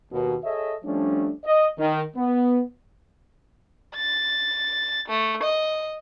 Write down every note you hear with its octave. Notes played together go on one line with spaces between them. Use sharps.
D#2 B2
G#4 A4 C#5 D#5 E5
F3 G3 A3 C#4 D4
D#5
D#3
B3
A6
A3
D#5